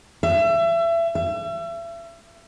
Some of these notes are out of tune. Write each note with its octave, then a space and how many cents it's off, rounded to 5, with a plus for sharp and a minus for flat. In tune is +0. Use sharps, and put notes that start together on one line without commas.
E5 +30
E5 +35